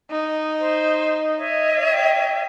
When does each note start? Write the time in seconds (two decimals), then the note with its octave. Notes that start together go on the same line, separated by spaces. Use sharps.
0.11 D#4
0.59 C5
1.37 C#5 D#5 E5
1.92 G5